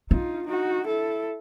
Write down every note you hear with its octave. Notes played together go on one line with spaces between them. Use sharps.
D4 D#4 F4
D#4 F#4
E4 A4